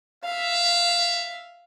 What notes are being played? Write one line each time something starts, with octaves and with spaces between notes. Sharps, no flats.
E5 F5